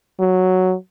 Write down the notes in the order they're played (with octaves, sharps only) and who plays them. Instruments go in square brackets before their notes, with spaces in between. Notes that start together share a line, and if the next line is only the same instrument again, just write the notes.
[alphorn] F#3